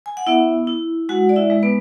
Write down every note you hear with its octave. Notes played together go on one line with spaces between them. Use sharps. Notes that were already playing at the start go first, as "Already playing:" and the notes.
G#5
F#5
B3 E4 E5
E4
G#3 F#4 F#5
D5
E4 E5
G#3
B3 B4